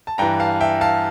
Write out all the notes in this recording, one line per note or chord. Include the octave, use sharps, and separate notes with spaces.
A5
G2 E3 G5 A#5
F5 A5
E5 G5
F5 A5